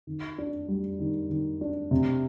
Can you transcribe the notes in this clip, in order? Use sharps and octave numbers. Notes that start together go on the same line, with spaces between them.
D#3
D4
G3
D#3
D#3
D4
C3